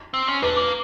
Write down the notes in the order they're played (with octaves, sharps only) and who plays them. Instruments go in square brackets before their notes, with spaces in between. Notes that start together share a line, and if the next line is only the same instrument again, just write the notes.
[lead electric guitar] C4
C#4
[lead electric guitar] D4 [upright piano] B4
[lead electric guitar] A#3